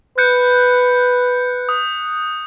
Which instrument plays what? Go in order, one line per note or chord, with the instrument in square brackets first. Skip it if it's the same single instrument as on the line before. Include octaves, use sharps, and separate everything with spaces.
[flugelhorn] B4 [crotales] F#6 G6 C#7
[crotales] D#6